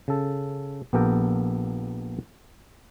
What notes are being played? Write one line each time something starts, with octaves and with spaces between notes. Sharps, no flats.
C#3 A4
A#1 B3 G4 A4 A#4 G5